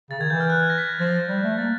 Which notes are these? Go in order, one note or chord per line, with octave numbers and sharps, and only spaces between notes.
C#3 A6
D#3 G#6
E3 G6
F6
F#6
G#6
A#6
B6
A#6
G#6
F3 A6
G3
A3
A#3 A6